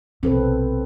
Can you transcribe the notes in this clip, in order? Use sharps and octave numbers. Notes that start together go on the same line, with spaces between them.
B1 C3 C4 A4 B4